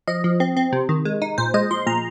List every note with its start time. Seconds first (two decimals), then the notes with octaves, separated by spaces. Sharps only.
0.07 F3 D#5
0.24 F3
0.40 C4
0.57 C4
0.73 C3
0.89 D#3
1.05 G#3
1.22 D#4
1.38 A#2 C5
1.54 G#3 D#5
1.71 F3 C6
1.86 A#2 A#5